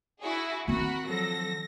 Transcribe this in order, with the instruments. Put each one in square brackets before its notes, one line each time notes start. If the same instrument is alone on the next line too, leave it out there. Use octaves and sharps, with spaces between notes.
[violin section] E4 F#4 G#4
[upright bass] D#3 C4 [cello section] F#4 [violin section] A#4 F#5 B5
[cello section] F3 F#3 A4 [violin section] A#6